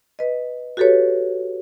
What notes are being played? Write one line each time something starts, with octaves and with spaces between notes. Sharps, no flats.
B4 D#5
F#4 G4 A4 B4 C#5